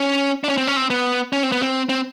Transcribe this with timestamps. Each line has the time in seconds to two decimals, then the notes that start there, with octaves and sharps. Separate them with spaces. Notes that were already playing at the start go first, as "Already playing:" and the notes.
Already playing: C#4
0.44 D4
0.48 C#4
0.57 C4
0.67 C#4
0.76 C4
0.90 B3
1.33 C#4
1.43 C4
1.52 B3
1.62 C4
1.89 C4